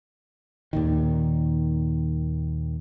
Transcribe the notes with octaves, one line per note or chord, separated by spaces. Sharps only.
D#2 A#2 D#3